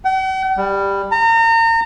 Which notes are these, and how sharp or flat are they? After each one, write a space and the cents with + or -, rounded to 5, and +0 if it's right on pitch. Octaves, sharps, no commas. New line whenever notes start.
F#5 +45
G3 +10
A#5 -35